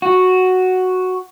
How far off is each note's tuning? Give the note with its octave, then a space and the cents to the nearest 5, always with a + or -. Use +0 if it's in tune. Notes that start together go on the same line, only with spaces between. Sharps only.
F#4 +0